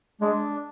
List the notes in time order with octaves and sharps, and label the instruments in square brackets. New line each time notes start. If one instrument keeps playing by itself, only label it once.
[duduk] G#3 [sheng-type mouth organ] D4